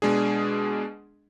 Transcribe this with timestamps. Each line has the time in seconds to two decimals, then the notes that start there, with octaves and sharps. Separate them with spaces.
0.02 B2 G#3 D4 G#4